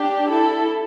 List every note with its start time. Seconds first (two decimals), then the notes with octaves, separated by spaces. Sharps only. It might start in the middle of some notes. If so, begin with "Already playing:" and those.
Already playing: D4 G4
0.30 E4 A4